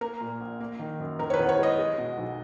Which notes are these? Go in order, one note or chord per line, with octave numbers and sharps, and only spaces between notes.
A#3 A#4
A#2
A#1
A#3
D#3
F#2
D#3 A#4
C#5
B4
E2
C#5
G#3 D#5
G#3
B2
B1